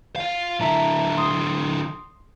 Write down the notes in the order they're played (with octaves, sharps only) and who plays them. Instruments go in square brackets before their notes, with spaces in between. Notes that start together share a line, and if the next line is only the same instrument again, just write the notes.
[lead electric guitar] F4 F5
[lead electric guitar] D3 E4 [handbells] E5 A5 A#5
[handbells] C6 D#6